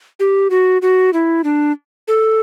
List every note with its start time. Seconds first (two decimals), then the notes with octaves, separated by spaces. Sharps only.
0.20 G4
0.50 F#4
0.82 F#4
1.13 E4
1.44 D4
2.08 A4